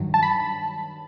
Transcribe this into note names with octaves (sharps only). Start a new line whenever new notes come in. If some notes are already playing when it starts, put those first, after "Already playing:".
Already playing: G2 D#3 F#3
A5
B5